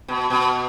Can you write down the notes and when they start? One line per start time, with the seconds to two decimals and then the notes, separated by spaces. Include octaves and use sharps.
0.08 B2
0.30 B2